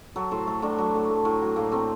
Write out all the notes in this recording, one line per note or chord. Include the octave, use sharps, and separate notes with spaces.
F#3 A4
A2 C5
A3 A4
A2 D4
F#3
A2
A3
A2
F#3
A2 A#3
A3 C4